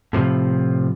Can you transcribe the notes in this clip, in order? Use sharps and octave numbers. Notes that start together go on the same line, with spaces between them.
A2 C3 F3